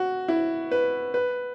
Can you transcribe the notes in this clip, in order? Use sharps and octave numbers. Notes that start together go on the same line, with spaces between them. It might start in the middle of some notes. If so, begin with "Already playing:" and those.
Already playing: F#4
E4
B4
B4